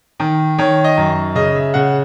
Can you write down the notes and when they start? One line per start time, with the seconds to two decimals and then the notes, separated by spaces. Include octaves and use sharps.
0.20 D#3
0.58 D#3 C#5
0.84 D#5
0.97 F#2
1.35 C#3 D#5
1.55 E5
1.74 C#3 F#5